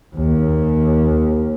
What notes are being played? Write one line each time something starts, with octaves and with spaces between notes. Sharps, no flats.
D#2